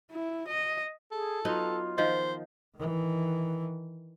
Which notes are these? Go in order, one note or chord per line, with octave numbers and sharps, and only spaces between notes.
E4
D#5
G#4 A4
F#3 B3 D#4 F4
D#3 F3 C5 D#5 F5
D#3 E3